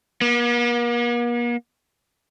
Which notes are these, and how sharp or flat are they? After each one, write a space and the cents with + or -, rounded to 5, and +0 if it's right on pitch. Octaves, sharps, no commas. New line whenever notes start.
A#3 +45